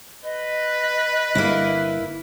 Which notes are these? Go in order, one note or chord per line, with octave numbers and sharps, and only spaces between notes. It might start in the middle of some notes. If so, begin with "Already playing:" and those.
B4 D#5
G1 A#3 E4